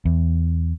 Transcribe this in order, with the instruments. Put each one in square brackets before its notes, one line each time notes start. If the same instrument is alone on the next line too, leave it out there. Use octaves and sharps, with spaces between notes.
[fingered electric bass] E2